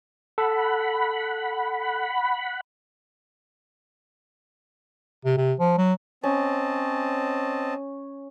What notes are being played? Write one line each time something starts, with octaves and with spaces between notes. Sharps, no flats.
A4 F#5 B5
C3
C3
F3
F#3
C4 C#4 D#5 A5